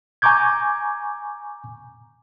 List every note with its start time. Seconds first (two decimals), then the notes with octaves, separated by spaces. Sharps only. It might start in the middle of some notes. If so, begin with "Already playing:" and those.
0.22 G#5 A#5 C#6 D6 G6 G#6